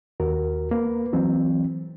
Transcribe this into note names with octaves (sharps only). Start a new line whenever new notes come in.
D#2 F#4 A#4
A#3 B4
E3 F#3 C4